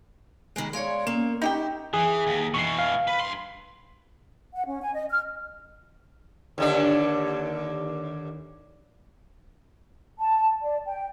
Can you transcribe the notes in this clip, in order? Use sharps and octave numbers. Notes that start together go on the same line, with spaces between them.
D#3 E3 G#3
G#3 C#5 D5 F5 C6
A#3 C#4
D#4 E4 G4 G5
E3 G#4
D#2
B2 E3 C#6 C7
F5
B4
G2 C6
F#5
C#4
G#5
D#5
F6
D#2 D3 D4
A5
D5
G5